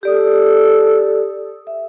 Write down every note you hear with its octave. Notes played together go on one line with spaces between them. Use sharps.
G4 A4 D5 D#6
E5